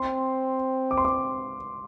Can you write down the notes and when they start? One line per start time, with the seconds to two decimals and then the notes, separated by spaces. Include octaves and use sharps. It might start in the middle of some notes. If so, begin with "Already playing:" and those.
Already playing: C4 C6
0.91 D6
0.98 C6
1.05 D6